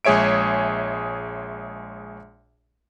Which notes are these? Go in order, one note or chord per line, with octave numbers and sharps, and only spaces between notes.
A#1 G#3 G#4 C#5 E5 D7